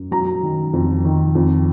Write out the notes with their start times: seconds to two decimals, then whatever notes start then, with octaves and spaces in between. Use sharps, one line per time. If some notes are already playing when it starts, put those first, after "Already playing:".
Already playing: F#2
0.11 F#3 A#5
0.42 D#3
0.73 F2
1.04 D#3
1.35 F2